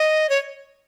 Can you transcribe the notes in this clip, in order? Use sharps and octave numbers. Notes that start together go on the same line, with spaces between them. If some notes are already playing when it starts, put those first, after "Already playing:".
Already playing: D#5
C#5